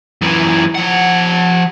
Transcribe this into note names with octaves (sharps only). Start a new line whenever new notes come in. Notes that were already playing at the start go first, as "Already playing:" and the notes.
F#2 E3
F3 F#5